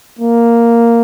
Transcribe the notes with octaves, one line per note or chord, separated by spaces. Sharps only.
A#3